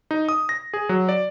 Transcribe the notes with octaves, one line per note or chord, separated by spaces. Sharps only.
D#4
D#6
A#6
G#4
F#3
D5